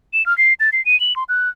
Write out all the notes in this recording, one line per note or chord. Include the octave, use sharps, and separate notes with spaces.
E7
F6
C7
A6
C7
D#7
F#7
C6
F#6